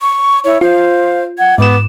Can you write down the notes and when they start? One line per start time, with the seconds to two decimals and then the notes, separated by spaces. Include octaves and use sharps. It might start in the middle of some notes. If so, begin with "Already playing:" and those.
0.01 C#6
0.44 E4 C#5
0.61 F4 C5 F5
1.38 F#5 G#6
1.58 G#2 B3 D6 E7